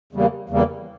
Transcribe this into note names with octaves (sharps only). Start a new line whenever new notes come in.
E2 C#3 G3 A#3
E2 C#3 G3 A#3